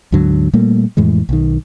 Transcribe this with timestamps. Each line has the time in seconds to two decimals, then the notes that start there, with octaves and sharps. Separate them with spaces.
0.12 D2 G#2 D3 F#3
0.53 A#2 G3 A3 A#3
0.97 F2 A2 E3 G#3
1.29 B1 D#3